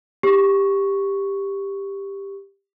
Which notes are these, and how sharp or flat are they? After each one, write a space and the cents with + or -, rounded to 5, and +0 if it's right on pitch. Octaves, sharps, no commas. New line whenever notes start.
G4 +10 C#6 +0